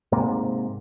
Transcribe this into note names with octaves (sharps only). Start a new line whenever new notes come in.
G#2 C3 A#3